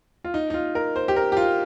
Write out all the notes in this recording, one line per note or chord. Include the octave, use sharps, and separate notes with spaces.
F4
D#4
D#4
F4
A#4
C5
G4
A#4
G4
F4